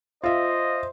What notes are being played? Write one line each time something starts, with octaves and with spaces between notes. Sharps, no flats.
F4 C5 D#5 E5